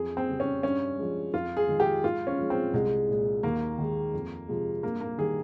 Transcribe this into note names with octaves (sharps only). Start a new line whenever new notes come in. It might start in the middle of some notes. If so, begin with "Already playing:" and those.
Already playing: F2 G#4
C4
C#3 G3
C#4
G2 C#4
F3 G#3
F2 F4
G#4
D#3 G#3
G4
G#2 F4
C#4
F3 G#3
C4
C2 G#3
A#2 G#3
D#2 A#3
D#3 G#3
F2
C3 F3 G#3
G2 A#3
A#3
D#3 G3 G#4